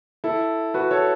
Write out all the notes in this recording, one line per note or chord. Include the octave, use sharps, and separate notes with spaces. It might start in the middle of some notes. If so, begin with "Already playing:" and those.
E4 A4
F#4 B4
A4 C#5